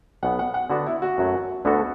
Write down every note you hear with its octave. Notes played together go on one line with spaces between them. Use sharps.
B1 B2 B3 F#5
F#5
F#5
D3 B3 D4 F#4
E4
F#4
F#2 F#3 A3
D2 D3 B3 F#4 A4